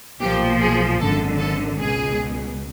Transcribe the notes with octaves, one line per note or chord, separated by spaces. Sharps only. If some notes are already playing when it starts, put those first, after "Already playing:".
B1 A#2 F3 G4
G#4
G#1 F#2 D3 A4
A4
C#2 B2 G#4